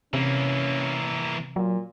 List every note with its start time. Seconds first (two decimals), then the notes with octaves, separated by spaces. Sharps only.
0.14 C3 E3 A#3 C#4
1.56 A#2 F#3